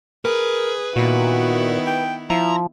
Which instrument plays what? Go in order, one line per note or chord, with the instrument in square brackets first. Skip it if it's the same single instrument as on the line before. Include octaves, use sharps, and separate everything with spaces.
[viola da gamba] G#4 [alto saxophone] A#4 [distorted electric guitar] B4
[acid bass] A#2 [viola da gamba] D#3 B3 E4 [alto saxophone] F#4
[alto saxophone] G5
[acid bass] F3 [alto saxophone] E4 [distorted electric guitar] A#5